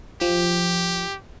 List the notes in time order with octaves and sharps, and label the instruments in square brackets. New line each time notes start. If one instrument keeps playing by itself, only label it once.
[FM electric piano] F3 [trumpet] G4